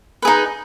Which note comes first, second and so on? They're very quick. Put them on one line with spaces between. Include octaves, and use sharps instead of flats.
B4 G#4 D#4